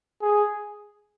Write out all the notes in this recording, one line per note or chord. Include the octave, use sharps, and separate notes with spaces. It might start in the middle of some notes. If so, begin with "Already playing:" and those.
G#4